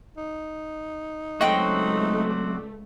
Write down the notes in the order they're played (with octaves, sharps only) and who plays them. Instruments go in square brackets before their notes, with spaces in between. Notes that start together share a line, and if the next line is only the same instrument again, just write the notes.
[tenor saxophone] D#4
[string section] C#2 A3 [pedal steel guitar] F#3 C4 F#4 [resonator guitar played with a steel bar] D#5 G5
[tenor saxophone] D5